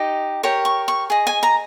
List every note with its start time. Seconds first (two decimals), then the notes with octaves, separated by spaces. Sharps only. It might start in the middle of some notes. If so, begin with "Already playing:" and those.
Already playing: D#4 G4 D#5
0.43 G4 A#4 C#5
0.65 C#6
0.88 C#6
1.10 G#4 D#5
1.27 G#5
1.43 A#5